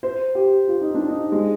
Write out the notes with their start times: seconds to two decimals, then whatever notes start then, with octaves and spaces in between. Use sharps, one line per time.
0.03 C5
0.35 G4
0.68 F4
0.81 D#4
0.95 D4
1.08 D#4
1.32 G#3